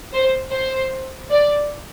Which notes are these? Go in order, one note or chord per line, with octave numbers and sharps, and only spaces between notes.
C5
C5
D5